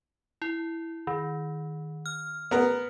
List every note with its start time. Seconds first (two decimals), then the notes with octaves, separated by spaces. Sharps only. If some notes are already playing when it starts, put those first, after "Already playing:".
0.42 E4
1.07 D#3
2.06 F6
2.51 B3 A#4